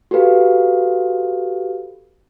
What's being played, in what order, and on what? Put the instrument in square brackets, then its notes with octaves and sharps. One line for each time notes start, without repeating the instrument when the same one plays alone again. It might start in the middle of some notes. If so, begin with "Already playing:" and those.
[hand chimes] F#4 G4 A4 B4 F5